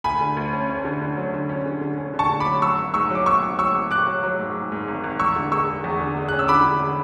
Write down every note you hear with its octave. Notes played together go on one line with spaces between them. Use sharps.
D2 G#5 B5
D3
D2
C#4
C#4
D3
D3
F#3
D3
C#4
D3
D3
C#4
D3
A5 C#6
D3
B5 D6
F#3
F#3 C#6 E6
G#1
G#2 C#6 E6
F#3 D6
G#1 C#6 E6
G#1
F#3 C#6 E6
G#1
G#1 D6 F#6
F#3
F#3
G#2
G#2
G#2
G#1
G#1
E2 C#6 E6
D3
G#3 C#6 E6
G#3
E2
D3
G#3
C#4 F#6
E6
D3 B5 D6
D3
D3